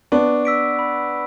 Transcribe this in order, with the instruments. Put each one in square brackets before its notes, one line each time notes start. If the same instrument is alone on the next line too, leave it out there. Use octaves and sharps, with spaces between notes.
[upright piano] B3 D4 [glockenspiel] C#6
[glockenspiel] E6 B6 D7
B5